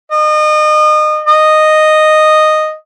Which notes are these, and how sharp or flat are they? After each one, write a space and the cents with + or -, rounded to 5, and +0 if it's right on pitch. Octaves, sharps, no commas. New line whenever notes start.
D#5 -30
D#5 -5